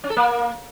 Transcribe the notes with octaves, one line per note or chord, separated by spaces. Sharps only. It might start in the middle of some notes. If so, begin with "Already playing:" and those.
C#4
A4
A#3